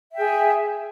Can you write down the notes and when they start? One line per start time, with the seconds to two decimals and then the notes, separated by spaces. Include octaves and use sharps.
0.12 E5
0.15 G5
0.18 G#4
0.21 G#5